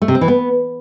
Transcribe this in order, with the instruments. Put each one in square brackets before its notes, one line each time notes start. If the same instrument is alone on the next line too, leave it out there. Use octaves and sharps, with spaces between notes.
[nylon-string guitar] A3
C3
C4
E3
B3